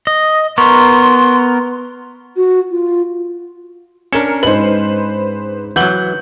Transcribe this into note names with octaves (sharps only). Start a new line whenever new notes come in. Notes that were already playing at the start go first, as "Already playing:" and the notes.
D#5
B3 A#4 C6 C#6
F#4
F4
C#4 D4 A#4 C#7 E7
G#2 B4 C5 D#5 F#7
E3 F#3 F#5 G6 F#7 G7